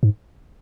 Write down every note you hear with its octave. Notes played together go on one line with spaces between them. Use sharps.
G#2